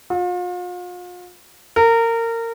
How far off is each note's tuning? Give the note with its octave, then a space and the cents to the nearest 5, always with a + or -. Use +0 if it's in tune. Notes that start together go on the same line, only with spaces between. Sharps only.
F4 +40
A#4 -25